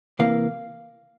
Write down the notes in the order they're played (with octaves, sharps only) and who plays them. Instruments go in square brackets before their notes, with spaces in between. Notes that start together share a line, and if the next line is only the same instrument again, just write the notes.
[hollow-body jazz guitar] C3 E3 A#3 F5